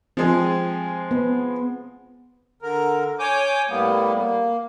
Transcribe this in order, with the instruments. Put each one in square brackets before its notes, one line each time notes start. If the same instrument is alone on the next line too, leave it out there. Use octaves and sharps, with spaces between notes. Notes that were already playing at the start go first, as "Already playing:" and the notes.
[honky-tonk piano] F3 G#3 G#4 [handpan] C4
[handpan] B3
[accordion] D3 A#4
C#5 G#5 D6 G6
A2 G3 A#3 B3
A#3